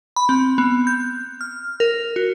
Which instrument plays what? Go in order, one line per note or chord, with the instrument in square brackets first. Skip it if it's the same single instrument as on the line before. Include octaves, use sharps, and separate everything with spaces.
[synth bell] B5
C4
B3
G6
F6
A#4
F#4